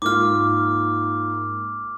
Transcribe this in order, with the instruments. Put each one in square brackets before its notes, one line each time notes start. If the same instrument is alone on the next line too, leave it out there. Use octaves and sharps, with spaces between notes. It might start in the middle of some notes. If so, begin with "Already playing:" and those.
[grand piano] G#2 A#3 F4 [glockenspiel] D6 F6